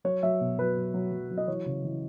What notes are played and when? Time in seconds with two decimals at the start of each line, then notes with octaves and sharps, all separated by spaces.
0.04 F#3 C#5
0.23 F#3 E5
0.41 B2
0.59 F#3 B4
0.76 F#3
0.94 F#3
1.12 F#3
1.31 F#3
1.38 D#5
1.47 E3 C#5
1.66 C#3
1.84 E3